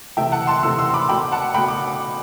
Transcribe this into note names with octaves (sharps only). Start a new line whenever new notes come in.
C3 E3 A3 E5 G5
F#5 A5
A5 C6
C3 E3 A3 C6 E6
C6 E6
B5 D6
B2 A3 G5 B5
F#5 A5
B2 A3 G5 B5
D6